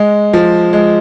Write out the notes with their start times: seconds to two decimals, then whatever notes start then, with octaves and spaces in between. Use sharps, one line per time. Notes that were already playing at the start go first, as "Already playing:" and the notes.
Already playing: G#3
0.33 F3
0.73 G#3